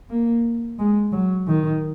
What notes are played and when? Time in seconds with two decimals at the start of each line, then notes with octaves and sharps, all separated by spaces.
0.10 A#3
0.79 G#3
1.12 F#3
1.48 D#3